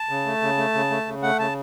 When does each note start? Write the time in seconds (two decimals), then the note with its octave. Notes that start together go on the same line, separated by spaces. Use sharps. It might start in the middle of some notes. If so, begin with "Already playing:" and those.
Already playing: A5
0.09 C#3
0.26 A3
0.41 C#3
0.57 A3
0.74 C#3
0.90 A3
1.06 C#3
1.23 A3 F#5
1.39 C#3 A5